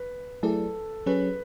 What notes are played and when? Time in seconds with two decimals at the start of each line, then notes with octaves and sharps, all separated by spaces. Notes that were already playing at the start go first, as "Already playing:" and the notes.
Already playing: B4
0.43 F#3 A3 E4 G#4 A4 D5
1.06 F#3 C#4 G#4 B4 C#5